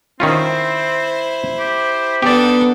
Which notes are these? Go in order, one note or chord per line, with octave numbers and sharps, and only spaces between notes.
D#3 C4 C#4 E4 F4 C5
G4
B3 D4 D#4 G4 A4 D5